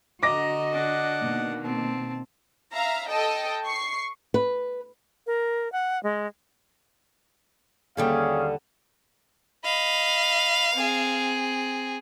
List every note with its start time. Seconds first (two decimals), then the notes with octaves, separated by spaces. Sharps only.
0.23 D3 F#4 D#5 A#5 D6 A#6
0.72 D4 F#5
1.21 B2 D#3 A#3
1.64 C4 A5
2.73 E5 F5 A#5
3.08 A4 D#5 G5 A5
3.65 C#6 C7
4.34 B4
5.27 A#4
5.72 F#5
6.03 G#3
7.97 D#2 D3 G3 C#4 G#4 F5
9.65 D#5 F5 B5
10.74 C4 G#4